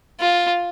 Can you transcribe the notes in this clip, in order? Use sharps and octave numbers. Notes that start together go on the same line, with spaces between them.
F4